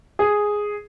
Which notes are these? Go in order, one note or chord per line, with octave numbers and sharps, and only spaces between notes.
G#4